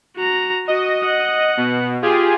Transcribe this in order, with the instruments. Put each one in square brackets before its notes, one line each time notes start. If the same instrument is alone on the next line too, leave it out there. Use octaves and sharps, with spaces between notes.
[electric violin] F#4 A#5
[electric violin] F#4 [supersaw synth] D#5
[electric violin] F#5
[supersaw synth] B2
F4 G4 G#4